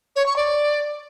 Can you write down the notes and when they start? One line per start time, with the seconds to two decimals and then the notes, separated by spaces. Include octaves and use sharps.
0.16 C#5
0.26 C#6
0.36 D5